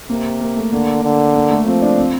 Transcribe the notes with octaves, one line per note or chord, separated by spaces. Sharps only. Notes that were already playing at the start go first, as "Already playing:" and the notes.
C3 A#3
A#3
A3
D3 A#3
D3
A#3
A3
F3 C4
D4
C4